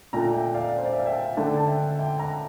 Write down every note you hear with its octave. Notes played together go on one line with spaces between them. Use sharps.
A#2 A3 D4 G5 A#5
E5 G5
D5 F5
C5
D5
E5
F5
E5 G5
D3 A3 D4 E5 G5
A5
E5 G5
E5 G5
G5 A#5